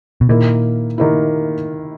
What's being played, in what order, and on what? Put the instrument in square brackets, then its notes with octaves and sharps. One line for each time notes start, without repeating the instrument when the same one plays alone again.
[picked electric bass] B2
[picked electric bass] A#2 [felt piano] D#3 A#3 E4
[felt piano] D#3 A#3 E4